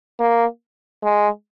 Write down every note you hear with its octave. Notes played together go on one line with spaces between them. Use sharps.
A#3
G#3